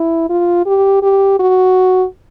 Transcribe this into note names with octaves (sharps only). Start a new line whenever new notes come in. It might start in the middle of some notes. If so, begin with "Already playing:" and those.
Already playing: E4
F4
G4
G4
F#4